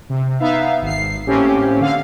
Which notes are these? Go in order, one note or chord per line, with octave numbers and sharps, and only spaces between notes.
C3
B3 D#4 E5 F5
G#1 C7
A2 A#3 C4 C#4 G4
D3 F5